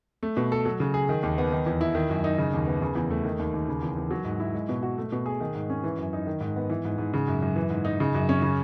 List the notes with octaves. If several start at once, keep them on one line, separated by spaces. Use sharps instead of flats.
A3
B2
A4
F#3
C#3
G#4
D#3
D#2
B3
D#3
E2
E4
D#3
F#2
D#4
C#3
D#2
B3
C#3
E2
A3
D#3
D#2
D#2
C#3
E2
E2
F#3
G#2
E4
G#3
B2
F#4
A3
B2
G#4
D#3
G#2
C#4
E3
F#2
D#4
D#3
G#2
B3
E3
G#2
G#2
C#3
F#2
F#2
E3
G#2
D#4
C#3
F#2
C#4
C#3